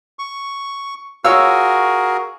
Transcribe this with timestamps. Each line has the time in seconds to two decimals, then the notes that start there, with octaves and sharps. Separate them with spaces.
0.19 C#6
1.24 F4 F#4 G#4 A#4 C#5 E6